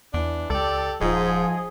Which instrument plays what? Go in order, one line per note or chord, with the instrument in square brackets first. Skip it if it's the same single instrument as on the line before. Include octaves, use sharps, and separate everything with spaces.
[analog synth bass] E2 [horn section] E3 D4
[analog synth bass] C#2 [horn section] G4 D5 [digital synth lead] A4
[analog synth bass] D#1 [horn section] G#2 [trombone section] F3 [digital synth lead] G#4